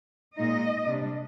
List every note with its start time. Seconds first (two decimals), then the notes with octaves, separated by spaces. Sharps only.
0.36 A#2 G#3 D#4 D#5
0.87 C3 G3 D4